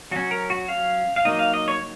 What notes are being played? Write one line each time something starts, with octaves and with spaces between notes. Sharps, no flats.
F#3 C#4 F#4
A#4
F#4
F5
F5
F#3 A#3 D#4 D#5
F5
D#5
C#5